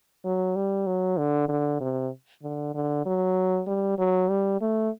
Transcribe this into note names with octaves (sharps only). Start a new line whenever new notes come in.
F#3
G3
F#3
D3
D3
C3
D3
D3
F#3
G3
F#3
G3
A3